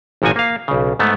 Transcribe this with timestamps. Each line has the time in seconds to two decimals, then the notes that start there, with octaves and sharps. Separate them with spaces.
0.22 G#1 A#2 F3 F#4 G#5
0.36 A#3 F5
0.68 B1 C#3
0.99 G#2 A3 B3